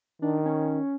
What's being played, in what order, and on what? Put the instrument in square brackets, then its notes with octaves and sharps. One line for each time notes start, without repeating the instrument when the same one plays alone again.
[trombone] D#3 [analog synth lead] D4
[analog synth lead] C#4